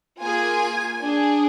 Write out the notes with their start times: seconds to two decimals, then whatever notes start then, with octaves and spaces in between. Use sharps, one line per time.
0.19 A#3 F4 G#4 G#5
1.00 D4 G#4